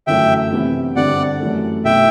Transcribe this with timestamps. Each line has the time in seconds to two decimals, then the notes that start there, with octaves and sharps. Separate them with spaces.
0.07 G1 F#2 E3 A3 E5 G5
0.51 C3 E3 B3 E4 G4
0.96 G2 D3 G3 C4 G4 D5 F#5
1.40 F#2 E3 A3
1.85 B1 B2 A3 E4 E5 G5